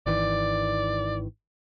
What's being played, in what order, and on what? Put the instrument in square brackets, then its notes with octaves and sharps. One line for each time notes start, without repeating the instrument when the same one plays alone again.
[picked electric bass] G#1 D#3 E3 [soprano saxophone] D5